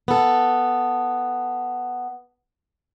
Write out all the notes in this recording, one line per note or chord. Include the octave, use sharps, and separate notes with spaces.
B3 A4